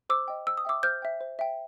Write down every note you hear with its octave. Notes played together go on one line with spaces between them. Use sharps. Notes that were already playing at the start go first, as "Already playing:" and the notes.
C5 D6 E6
D#5 G5
C5 E6
D#6
E5 G5 D6 E6
C5 F6 G6
E5 G5
C5
E5 G5